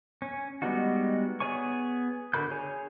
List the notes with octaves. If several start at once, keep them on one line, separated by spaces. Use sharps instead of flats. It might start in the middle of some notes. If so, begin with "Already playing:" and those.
C#4
G3 G#3 B3 D#4 F#4
B3 G#4 C#5 G#5 C#6
D3 F#4 A#4 B5 G6
G#4 C#5 G#5